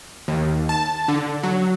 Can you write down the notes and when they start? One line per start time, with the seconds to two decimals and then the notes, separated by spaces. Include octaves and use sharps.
0.28 D#2
0.69 A5
1.08 D3
1.43 F#3